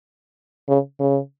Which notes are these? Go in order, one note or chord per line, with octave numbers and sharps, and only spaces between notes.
C#3
C#3